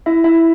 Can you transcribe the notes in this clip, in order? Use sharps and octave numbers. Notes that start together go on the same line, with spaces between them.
E4 E5
E4 E5